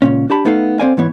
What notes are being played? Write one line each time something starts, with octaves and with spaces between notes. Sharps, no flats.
C#2 G2 A#2 C#4
D4 G4 A5 B5
A3 B3 D#4 A4 F5
C4 A4 C5 D5 F5 G#5
G#2 E3 B3 C#5